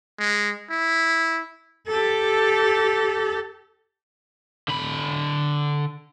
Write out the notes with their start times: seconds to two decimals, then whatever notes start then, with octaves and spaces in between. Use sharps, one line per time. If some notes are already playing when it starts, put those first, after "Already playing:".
0.19 G#3
0.70 E4
1.87 G4 A4
4.68 D3 B5